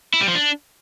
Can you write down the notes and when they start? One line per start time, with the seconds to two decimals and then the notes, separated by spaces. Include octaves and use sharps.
0.14 E4
0.21 G3
0.28 F3
0.35 D4